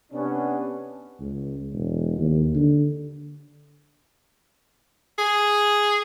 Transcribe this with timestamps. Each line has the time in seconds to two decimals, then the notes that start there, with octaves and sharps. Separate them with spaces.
0.12 C3 B3 C#4 D4
1.20 C#2
1.74 E1
2.18 D#2
2.55 D3
5.18 G#4